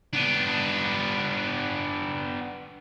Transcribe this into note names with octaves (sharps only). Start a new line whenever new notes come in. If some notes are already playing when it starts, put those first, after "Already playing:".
B3 D4